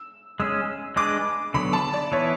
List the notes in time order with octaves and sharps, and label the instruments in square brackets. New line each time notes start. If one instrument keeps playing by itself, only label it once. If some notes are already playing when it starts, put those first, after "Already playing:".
Already playing: [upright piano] E6
[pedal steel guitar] G#3 C#4 G#4 [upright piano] E6
[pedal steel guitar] G#3 D4 G#4 B4 [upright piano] D6
[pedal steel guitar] D3 F#3 B3 [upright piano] B5
[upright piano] A5
D5
[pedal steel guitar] E3 B3 E4 [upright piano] C#5